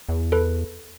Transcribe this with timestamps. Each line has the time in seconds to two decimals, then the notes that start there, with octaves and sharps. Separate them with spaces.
0.09 E2
0.32 A4 B4